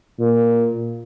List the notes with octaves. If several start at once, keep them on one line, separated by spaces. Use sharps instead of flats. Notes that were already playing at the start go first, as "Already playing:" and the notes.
A#2